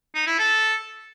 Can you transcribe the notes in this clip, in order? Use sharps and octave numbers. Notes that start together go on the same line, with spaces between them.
D#4
E4
A4